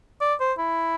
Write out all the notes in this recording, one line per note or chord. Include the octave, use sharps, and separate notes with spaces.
D5
C5
E4